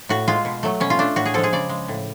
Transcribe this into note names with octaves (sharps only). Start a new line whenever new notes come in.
A2 F#4
G#3 F4
B2
F#3 A3
B2 C#4
F4
A3 D4
A2 F#4
G#4
F3 G#3 A4
G#4
C#3 D5
G#3
A2